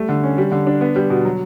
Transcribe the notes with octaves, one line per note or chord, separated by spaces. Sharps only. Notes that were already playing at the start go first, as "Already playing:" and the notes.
Already playing: G3 A3
D3
C#4
G3
D3
D4
B3
G3
B2
F#3